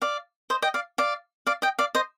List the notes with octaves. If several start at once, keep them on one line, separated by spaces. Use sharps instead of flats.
D5 F5
C5 D#5
D#5 G5
D5 F5
D5 F5
D5 F5
D#5 G5
D5 F5
C5 D#5